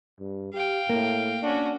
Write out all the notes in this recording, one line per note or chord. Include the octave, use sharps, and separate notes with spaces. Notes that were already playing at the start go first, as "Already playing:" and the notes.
G2
G4 F5 G5
A2 A#3
C#4 D4 F#4